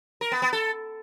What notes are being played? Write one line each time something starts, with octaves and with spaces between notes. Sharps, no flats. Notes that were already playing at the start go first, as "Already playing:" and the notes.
A#4
B3
B3
A4